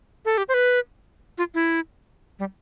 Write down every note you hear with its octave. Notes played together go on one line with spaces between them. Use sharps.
A4
G4
C5
B4
F4
E4
G3